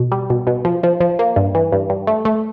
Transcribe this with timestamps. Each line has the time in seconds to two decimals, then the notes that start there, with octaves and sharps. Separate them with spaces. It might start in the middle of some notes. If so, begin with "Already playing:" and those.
Already playing: B2
0.12 G3
0.30 B2
0.47 B2
0.65 F3
0.83 F3
1.00 F3
1.19 A#3
1.36 G2
1.55 E3
1.72 G2
1.90 G2
2.07 A3
2.25 A3